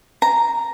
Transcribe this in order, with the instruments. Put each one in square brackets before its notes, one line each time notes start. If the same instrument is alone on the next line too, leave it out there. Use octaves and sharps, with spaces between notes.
[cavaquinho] A#5